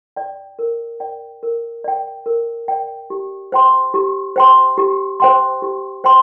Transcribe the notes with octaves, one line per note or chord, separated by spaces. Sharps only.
D5 G5
A#4
D5 G5
A#4
D5 G5
A#4
D5 G5
G4
C5 G5 C6
G4
C5 G5 C6
G4
C5 G5 C6
G4
C5 G5 C6